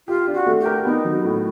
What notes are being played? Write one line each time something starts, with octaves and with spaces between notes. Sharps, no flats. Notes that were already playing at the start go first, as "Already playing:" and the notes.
F4 G4
D4
F#4
A3
G4
A#4
B3 D#4
F#3
A2